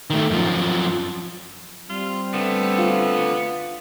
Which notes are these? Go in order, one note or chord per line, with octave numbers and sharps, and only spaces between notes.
D#3 A3
F#2 F3
G3 C4 F4
D3 A3 B3
F4